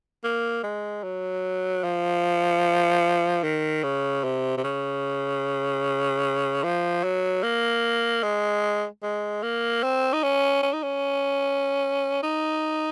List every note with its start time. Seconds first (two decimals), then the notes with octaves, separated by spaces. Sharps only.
0.24 A#3
0.63 G#3
1.04 F#3
1.83 F3
3.43 D#3
3.83 C#3
4.24 C3
4.57 C3
4.64 C#3
6.63 F3
7.04 F#3
7.43 A#3
8.23 G#3
9.03 G#3
9.43 A#3
9.83 C4
10.13 D#4
10.23 C#4
10.63 C#4
10.73 D#4
10.83 C#4
12.23 D#4